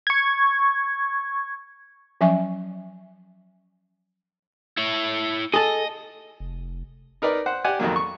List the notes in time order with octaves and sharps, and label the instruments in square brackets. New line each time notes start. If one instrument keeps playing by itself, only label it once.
[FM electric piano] C#6 G#6
[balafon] F3 F#3 C#4 E5 G#5 C#6
[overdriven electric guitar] E4 C#5
[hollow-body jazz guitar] G#4 A4 [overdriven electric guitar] D#5
[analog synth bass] F1
[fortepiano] D#4 A#4 B4 D5
C5 F#5
G4 D5 F#5 G#5
F2 D#3 F#3 A#3
C#6